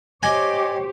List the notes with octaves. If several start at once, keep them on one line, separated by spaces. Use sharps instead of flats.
G4 C5 C#5 D#5 G#5 D6